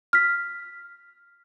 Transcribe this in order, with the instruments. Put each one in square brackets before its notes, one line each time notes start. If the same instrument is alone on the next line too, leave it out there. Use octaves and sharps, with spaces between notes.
[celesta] F6 B6